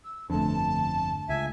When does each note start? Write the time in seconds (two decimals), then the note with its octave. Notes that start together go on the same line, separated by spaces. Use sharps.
0.04 E6
0.30 G1 F2 D3 A3 A5
1.29 C#2 E5 G#5